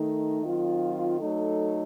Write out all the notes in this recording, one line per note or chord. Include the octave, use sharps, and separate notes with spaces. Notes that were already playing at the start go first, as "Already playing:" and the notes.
Already playing: D#3 A3 D#4
D#3 F#3 C4 F4
F#3 A3 D#4 A4